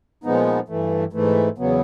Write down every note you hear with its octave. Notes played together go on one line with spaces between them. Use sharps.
A#2 F3 G#3 B3 D#4
G2 E3 A3
G#2 E3 A3
E2 C#3 F#3 B3